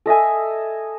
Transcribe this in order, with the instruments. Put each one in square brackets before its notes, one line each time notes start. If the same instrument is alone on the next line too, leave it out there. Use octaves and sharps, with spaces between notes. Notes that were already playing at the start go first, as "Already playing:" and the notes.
[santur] A4 D#5 E5 G#5